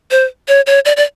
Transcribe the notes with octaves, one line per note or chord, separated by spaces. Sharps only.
C5
C#5
C#5
D5
D5